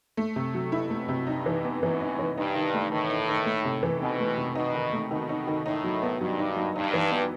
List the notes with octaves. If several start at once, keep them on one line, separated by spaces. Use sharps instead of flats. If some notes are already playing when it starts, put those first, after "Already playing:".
A3
C3
F#3
B2 E4
A3
C3
G2 D#4
E3
B3
F#2 E3
D#4
E3
G2 D#4
D#3
A3
A2 D#3
D#4
D#3
A3
C3
E3
B2 C4
A3
C3
B2 D#4
D#3
A3
B2 D#3
D#4
D#3
A2 D#4
F#3
B3
G2 F#3
D#4
F#3
G2 D#4
E3
B3